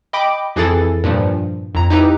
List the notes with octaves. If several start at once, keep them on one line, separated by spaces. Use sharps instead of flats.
D#5 G5 B5 D6 D7
F2 E3 E4 G#4 A4 A6
G2 A#2 F3
F2 A#5
D#4 E4 G4 B4 A#5